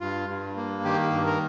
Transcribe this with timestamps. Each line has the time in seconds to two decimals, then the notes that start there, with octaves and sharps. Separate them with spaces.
0.01 G2 F4
0.29 G2
0.57 A#3
0.85 D#3 G4
1.12 G2
1.26 A#4